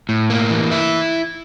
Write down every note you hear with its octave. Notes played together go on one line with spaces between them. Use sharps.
A2
A#3
E3
E4